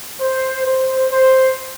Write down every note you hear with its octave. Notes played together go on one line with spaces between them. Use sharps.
C5
C5
C5